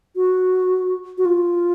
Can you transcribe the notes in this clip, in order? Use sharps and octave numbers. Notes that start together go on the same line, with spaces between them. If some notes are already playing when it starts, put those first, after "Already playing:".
F#4
F#4
F4